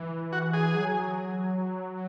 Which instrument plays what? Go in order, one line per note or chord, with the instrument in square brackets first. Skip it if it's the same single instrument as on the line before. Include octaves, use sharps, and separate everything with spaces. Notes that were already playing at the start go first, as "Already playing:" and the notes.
Already playing: [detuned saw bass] E3
[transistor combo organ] F#4
G#4
[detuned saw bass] F#3